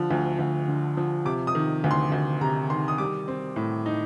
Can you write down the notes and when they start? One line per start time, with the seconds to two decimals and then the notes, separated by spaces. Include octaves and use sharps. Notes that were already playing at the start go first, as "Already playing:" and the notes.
Already playing: D3 F3
0.11 D2
0.39 D2
0.68 D3
0.97 F3
1.25 C3 D6
1.47 D#6
1.55 D#3
1.84 D2
1.91 C6
2.12 D2
2.41 C3 A#5
2.70 D#3 C6
2.88 D#6
2.98 G3 D6
3.28 C4
3.56 A2
3.86 D#4